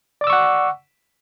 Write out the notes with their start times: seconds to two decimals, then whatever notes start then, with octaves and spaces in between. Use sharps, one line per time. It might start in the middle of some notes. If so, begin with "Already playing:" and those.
0.21 D5
0.24 D6
0.27 E6
0.30 C#6
0.33 F#5